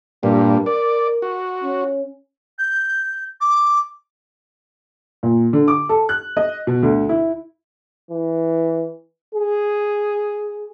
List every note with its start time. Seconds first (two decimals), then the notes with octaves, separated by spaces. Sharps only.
0.23 G2 A#2 G3
0.66 A#4 D5
1.22 F#4
1.64 C#4
2.58 G6
3.41 D6
5.23 A#2
5.53 D3
5.68 D6
5.89 A4
6.09 F#6
6.37 D#5
6.67 B2
6.83 D2
7.09 E4
8.11 E3
9.35 G#4